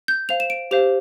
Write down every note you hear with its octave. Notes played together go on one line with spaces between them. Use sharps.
G6
C5 F5 F7
E7
D7
G4 C5 F5 F7